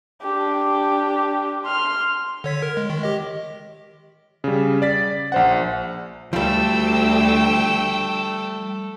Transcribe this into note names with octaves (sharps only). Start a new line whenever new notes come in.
D4 G4
C6 F6
D3 C#5 B6
A#4
G#3
D#3
G4 D#5
C#3 G3
D5 A6 B6
A#1 C5 F#5
D2 F3 G3 A3 G5 E6